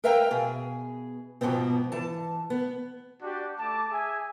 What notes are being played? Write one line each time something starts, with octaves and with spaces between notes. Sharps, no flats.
A#4 B4 E5 F5 G5 A#5
B2 G#4
G#2 B2 F3 B3 C4
E3 A5
B3
D4 F#4 G4 D5
A3 A5 D6
G#4 E5 G#5